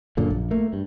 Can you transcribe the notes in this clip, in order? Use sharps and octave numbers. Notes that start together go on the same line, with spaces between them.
F#2 A#2 D3
A#1
A3 A#3
G2